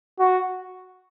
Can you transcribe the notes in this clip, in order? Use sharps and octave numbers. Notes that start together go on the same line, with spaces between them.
F#4